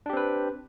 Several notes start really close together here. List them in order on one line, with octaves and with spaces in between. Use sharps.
D4 G4 C4 B4